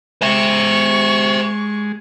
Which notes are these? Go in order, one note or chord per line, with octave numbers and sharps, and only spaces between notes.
G#3 C5 E5 C#6